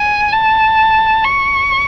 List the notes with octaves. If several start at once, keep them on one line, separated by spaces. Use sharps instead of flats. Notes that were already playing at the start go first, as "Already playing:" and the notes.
Already playing: G#5
A5
C#6